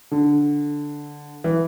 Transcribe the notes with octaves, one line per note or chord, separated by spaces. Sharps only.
D3
E3